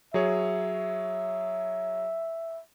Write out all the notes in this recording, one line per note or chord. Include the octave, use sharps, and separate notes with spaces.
F#3 G#4 C#5 E5